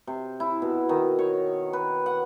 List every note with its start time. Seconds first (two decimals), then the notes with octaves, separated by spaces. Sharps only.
0.07 C3
0.40 E4
0.62 B2
0.89 D#3
1.19 C#5
1.73 B4
2.06 F#5